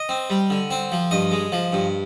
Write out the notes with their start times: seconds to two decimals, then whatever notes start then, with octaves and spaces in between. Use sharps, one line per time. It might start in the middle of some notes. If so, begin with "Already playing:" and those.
Already playing: D#5
0.09 C4
0.30 G3
0.50 D3
0.71 C4
0.92 F3
1.11 G2 D#5
1.32 G#3
1.52 F3
1.72 G2